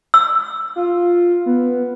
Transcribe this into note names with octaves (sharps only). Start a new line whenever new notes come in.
E6
F4
B3